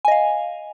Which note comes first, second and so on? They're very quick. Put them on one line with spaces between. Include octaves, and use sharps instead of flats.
G#5 D#5 F5